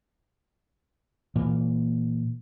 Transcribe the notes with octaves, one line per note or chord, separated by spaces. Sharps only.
A#2 E3 A#3